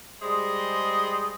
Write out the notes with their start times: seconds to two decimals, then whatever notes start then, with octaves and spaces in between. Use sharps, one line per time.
0.22 G3 G#3 G#4 C5 D#5